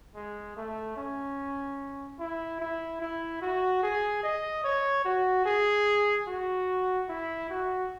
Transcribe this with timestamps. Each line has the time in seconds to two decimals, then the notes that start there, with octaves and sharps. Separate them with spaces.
0.15 G#3
0.56 A3
0.97 C#4
2.19 E4
2.60 E4
3.01 E4
3.42 F#4
3.83 G#4
4.23 D#5
4.64 C#5
5.05 F#4
5.46 G#4
6.27 F#4
7.09 E4
7.50 F#4